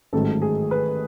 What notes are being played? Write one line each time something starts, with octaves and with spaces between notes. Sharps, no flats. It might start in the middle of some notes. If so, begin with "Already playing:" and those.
A1 G#2 D#3 F#3 A3 A4
G#4
B4